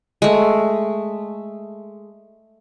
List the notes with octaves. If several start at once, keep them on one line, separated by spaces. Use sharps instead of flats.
G#3 A3